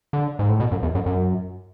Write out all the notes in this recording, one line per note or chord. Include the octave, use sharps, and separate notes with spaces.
D3
G#2
A2
B2
F#2
E2
F#2
F#2